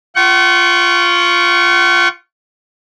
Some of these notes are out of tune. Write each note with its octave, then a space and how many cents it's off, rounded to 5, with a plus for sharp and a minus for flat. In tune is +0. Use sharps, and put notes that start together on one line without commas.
F4 -5 F#5 +45 C#6 +0